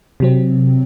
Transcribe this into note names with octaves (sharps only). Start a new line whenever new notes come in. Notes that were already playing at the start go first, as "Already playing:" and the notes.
C3 F#3 C4